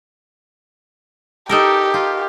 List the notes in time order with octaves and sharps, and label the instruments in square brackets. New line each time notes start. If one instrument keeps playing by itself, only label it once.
[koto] D#4 A4 A#4 [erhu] G4
[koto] F4